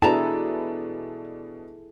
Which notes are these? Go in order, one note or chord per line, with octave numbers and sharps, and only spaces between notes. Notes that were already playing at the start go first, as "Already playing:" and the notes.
B2 D4 E4 G#4 A4 B4 A5 A#5